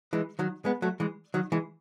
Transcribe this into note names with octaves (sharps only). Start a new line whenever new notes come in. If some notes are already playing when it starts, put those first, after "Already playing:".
E3 G#3
D#3 F#3
G#3 B3
F#3 A3
E3 G#3
D#3 F#3
E3 G#3